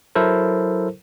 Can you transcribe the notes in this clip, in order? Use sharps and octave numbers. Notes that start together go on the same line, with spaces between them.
F#3 E4 A4 A#4 C5